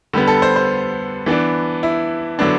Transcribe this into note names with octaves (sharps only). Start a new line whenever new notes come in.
D3 G3 B3
A4
C5
C5
E3 B3 D4
E4
D3 F#3 B3 D4